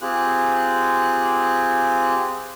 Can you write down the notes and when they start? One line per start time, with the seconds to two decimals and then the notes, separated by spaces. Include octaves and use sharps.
0.01 C4 F4 G4 G#4 F#6